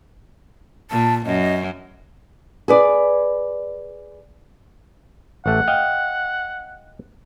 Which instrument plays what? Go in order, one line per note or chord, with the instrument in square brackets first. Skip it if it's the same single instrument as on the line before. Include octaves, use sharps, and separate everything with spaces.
[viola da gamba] A#2 [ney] A5
[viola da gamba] F#2 [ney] D#5
[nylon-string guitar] G#4 B4 D5
[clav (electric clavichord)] A1 A3 [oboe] F#5
[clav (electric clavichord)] D#5 F5 G5